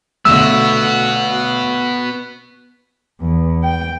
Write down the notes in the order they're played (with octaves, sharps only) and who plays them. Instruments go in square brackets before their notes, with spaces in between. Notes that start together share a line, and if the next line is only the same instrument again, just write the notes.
[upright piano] B1 D3 A3 [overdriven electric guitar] B3 F#4 [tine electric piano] E6
[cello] E2
G5